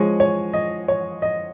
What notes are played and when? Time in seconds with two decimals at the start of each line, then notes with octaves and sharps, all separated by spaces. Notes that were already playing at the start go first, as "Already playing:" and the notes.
Already playing: F3 G#3 C#4 G#5 C#6
0.20 C#5
0.53 D#5
0.88 C#5
1.22 D#5